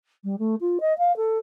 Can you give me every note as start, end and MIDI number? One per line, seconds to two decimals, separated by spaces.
0.24 0.35 55
0.39 0.55 57
0.60 0.78 65
0.80 0.96 75
0.98 1.15 77
1.16 1.38 69